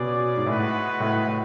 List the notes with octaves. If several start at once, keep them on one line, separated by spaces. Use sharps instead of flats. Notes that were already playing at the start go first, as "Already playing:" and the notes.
Already playing: B2 C#4 G#4 D5
G#2
A2 G#3 B3 F#4 B4
A2
A2